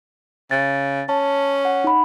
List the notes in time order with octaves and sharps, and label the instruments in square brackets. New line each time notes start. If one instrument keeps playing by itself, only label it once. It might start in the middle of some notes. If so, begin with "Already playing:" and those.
[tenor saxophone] C#3 [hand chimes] A6
[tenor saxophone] C#4 [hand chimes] A5
[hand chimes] F#5
D#4 B5